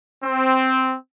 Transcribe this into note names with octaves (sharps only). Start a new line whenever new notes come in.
C4